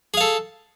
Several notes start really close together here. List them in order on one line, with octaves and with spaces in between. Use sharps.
G#4 F5 A4